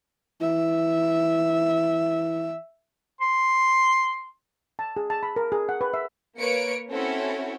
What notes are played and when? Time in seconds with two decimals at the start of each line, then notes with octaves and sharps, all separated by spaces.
0.41 E3 E5
3.21 C6
4.79 A5
4.97 G#4
5.10 A5
5.23 B5
5.36 A#4
5.52 G#4
5.69 F#5
5.81 B4
5.94 E5
6.38 A#3 B4 C#5 C#7 D7
6.91 C4 C#4 E4 F#4 A4 C#5